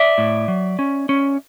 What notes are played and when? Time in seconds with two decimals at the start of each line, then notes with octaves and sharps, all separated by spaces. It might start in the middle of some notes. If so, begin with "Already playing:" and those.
Already playing: D5 E5
0.18 A2
0.48 F#3
0.79 C#4
1.09 C#4